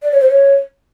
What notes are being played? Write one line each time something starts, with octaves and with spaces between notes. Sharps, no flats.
D5
C#5
C5
C#5